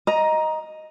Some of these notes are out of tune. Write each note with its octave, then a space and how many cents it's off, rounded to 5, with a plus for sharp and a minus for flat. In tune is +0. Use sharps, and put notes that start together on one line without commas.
D#5 +0 A#5 +15